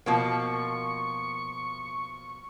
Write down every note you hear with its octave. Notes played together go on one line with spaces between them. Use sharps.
B2 F3 A#3 C#6